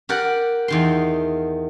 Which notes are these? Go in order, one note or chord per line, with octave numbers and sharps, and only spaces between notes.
G4 A#4 D5 F#5
E2 D#3 C6